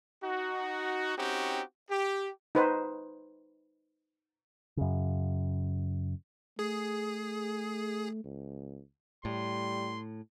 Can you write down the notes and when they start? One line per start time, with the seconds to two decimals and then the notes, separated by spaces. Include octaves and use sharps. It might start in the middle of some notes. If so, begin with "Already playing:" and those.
0.24 D#4 F#4
1.17 C4 C#4 D#4 F#4 G4
1.90 G4
2.55 D#4 B4 C5
4.77 F#2 C#3
6.59 A3 G#4
8.24 C#2
9.25 A2 G3 C6